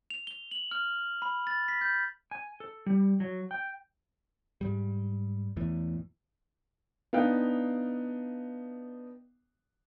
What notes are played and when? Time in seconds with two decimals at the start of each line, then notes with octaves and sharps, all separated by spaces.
0.10 F7
0.27 G7
0.51 F#7
0.71 F6
1.22 B5
1.47 A6
1.68 B6
1.81 G6
2.31 G#5
2.60 A4
2.86 G3
3.20 F#3
3.51 G5
4.61 G#2 G3
5.57 E2 A2 E3
7.13 B3 D4 D#4 F5 G5 F#6